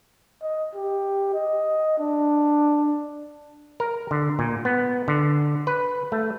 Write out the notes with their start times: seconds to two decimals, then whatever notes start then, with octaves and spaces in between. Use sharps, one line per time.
0.42 D#5
0.75 G4
1.34 D#5
1.99 D4
3.80 A#4
4.11 D3
4.39 A#2
4.65 B3
5.08 D3
5.67 B4
6.12 A3